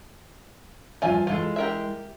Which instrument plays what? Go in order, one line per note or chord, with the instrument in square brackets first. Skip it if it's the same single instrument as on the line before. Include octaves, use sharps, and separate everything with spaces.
[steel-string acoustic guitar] G2 F3 F#4 [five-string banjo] F4 E5 G#5
[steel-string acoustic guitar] E3 G#3 [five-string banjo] F4 A4
[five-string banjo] G4 A#4 E5